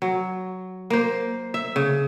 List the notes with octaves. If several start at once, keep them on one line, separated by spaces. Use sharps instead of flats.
F#3
A#3 C5
E5
C#3